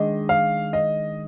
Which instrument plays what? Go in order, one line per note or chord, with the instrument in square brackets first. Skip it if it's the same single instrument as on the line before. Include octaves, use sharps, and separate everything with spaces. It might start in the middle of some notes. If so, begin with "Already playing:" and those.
Already playing: [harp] D#3 G#3 D4 G#4 [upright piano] D#5
[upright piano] F5
D#5